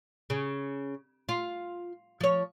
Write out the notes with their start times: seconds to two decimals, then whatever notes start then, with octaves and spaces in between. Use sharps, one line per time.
0.30 C#3
1.29 F4
2.21 F3 C#5